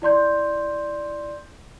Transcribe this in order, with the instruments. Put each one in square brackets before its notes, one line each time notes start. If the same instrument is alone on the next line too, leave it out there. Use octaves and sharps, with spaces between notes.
[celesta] E4 D5 C6 G6